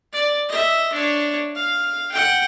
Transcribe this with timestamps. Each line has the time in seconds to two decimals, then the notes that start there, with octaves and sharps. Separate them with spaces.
0.13 D5
0.49 D#5 E5
0.93 D4 C#5
1.56 F5
2.12 F#5 G5